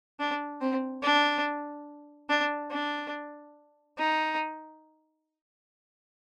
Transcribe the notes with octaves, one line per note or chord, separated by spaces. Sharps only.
D4
C4
D4
D4
D4
D#4